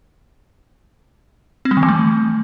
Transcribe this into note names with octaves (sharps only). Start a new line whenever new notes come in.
C4
G3
D#3
E3
A3